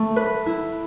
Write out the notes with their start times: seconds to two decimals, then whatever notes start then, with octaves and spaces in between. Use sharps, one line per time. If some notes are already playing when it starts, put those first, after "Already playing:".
Already playing: A3
0.16 B4
0.46 E4